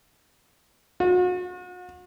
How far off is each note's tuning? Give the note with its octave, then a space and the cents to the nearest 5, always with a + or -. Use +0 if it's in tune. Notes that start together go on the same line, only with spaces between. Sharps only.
F#4 -40